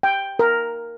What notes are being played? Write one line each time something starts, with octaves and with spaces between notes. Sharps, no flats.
G5
A#4